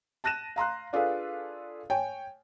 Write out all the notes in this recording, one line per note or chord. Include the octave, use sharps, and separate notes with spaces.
A5 F#6 A#6 D#7 E7
F5 A#5 C6 F#6
D4 F4 G#4 A4 B4 F5
C#5 G5 G#5